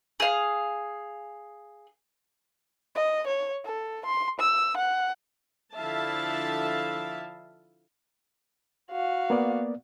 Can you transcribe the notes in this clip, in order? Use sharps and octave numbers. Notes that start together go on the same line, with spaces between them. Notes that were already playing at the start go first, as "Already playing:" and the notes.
G#4 F5
D#5
C#5
A4
C6
E6
F#5
D3 F3 E4 E5 F5 A5
F#4 F5
A#3 B3 D5